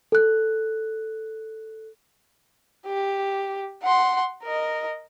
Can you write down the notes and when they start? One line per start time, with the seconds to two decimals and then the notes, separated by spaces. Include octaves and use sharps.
0.12 A4 F#6
2.87 G4
3.83 F#5 C6
4.43 A#4 D#5